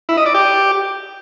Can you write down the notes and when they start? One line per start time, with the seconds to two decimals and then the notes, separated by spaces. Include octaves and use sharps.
0.09 E4
0.17 D#5
0.26 D5
0.34 G4